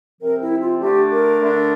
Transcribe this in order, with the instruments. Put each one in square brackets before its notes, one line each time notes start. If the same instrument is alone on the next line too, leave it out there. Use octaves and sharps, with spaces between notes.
[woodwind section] C3 F3 C4 A#4
E4
F4
D3 A3 D4 G4
A#4
D3 A3 D4